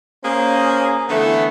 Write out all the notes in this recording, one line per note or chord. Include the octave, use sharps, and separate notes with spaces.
A#3 C#4 G#4 C5
D3 E3 A3 B3